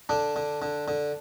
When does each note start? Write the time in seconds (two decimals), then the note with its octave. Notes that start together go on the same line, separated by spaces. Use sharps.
0.09 D3 D4
0.36 D3
0.62 D3
0.88 D3